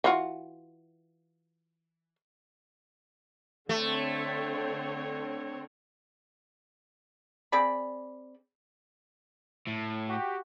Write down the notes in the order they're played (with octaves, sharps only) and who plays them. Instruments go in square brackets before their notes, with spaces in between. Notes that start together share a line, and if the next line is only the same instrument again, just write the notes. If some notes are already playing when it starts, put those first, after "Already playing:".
[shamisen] E3 F4 F#4
[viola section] D3 C4 C#5 [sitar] A3
[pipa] C4 G#4 D5 B5
[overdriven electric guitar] A2
[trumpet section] F#4 G4